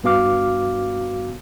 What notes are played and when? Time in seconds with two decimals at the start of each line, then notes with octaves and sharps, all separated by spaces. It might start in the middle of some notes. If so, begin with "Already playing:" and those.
0.04 G2 B3 F#4 F5 D6 F6